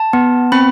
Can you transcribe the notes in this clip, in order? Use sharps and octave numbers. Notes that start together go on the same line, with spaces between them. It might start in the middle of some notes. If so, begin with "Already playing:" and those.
Already playing: A5
B3
C4 B5